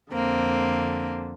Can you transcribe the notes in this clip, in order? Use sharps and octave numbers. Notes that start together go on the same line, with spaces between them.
F2 D3 A#3 C4